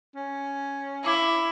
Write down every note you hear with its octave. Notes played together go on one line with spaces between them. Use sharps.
C#4
E4 A5 D6 G#6